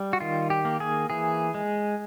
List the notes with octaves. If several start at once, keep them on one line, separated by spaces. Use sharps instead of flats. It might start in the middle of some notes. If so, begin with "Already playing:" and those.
Already playing: G3
F#4
D#3 F4
G4
A#3
G#4
E3 G#4
G#3